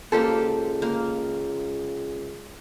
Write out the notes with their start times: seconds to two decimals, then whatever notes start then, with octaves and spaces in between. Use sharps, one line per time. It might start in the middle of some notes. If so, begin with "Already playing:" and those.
0.12 C#2 A#3 G4 A4 C5
0.82 A#3